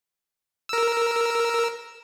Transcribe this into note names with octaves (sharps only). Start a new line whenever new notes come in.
A#4 E6